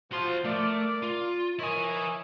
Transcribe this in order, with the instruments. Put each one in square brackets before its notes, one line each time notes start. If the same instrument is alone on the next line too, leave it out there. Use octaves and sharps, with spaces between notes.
[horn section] F3 [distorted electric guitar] F#4 C6
[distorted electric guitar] A3 [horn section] A#4 D5
[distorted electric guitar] F4
[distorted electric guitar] E4 G#5 [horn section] A#4 C#5 D#5